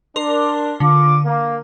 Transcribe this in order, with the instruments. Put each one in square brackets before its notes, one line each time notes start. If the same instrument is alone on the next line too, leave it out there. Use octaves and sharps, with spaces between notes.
[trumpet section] D4 [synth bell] A#4 C6
[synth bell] D3 [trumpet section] F4 D6
[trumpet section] A#3